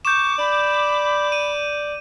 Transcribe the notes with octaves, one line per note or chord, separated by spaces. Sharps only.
C#6 D6 G6 E7
D5 B5
D#7